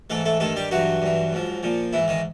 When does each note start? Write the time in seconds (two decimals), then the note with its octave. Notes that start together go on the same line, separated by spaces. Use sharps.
0.10 G#2 E3 A3 A4
0.25 A3 A4
0.40 G2 D#3 A3 A4
0.56 G3 G4
0.71 G2 E3 F#3 F#4
1.02 G2 E3
1.33 G#2 F3
1.63 A#2 F3
1.93 G#2 E3 E4
2.08 D#3 D#4